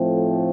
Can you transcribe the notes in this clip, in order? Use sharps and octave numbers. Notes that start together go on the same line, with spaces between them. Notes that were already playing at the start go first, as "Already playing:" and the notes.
Already playing: A2 F3 A3 C4